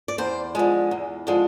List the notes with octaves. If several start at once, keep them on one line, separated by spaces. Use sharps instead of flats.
D5
E2 C5
D3 F3 G#3
E2
D3 F3 G#3